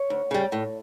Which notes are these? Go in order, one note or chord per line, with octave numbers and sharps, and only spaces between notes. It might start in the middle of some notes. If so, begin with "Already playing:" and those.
Already playing: C#5
D2
C#3 G3
A2